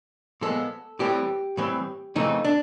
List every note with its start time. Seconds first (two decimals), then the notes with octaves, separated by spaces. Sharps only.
0.41 A#2 F3 G#3 B3 A4
0.99 A2 E3 G3 C4 G4
1.57 A2 E3 G3 C4
2.16 F2 C#3 E3 A3 C4 D#4
2.44 D4